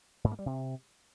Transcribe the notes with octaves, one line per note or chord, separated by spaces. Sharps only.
G#2
A#3
G3
C3